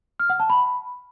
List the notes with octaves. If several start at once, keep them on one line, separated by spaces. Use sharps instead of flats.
F6
F#5
A5
B5